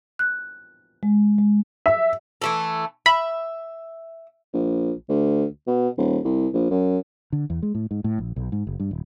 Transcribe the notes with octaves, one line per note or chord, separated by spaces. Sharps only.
F#6
G#3
G#3
E5
E3 A3 A4
E5 B5
A#1
D2
B2
D#1
C2
A#1
F#2
D3
E2
G#3
A2
G#2
A2
A#1
B1
G#2
F#1
G2
D#1